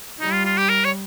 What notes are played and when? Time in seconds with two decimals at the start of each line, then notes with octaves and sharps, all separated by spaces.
0.20 G3 D#4
0.32 F4
0.45 F4
0.58 G4
0.69 A#4
0.85 C#5